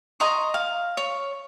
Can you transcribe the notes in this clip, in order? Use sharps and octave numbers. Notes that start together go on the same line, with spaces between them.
D#5 A#5 C6 C#6
F5
C#5